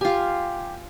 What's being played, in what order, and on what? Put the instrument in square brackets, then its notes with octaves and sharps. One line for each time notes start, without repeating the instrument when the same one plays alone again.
[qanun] F4 G#5 [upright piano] G4